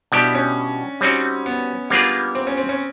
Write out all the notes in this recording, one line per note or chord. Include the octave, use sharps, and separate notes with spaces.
B2 G3 B3 D4 E4 G4
C#4
G3 C4 C#4 D#4 F#4
B3
G3 A#3 B3 D4 F4 G#4
C4
C#4
C4
C#4